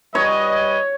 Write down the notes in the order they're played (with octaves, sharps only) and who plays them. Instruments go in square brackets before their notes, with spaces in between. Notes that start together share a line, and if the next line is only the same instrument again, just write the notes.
[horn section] G3 B4 D#5 [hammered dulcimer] C#5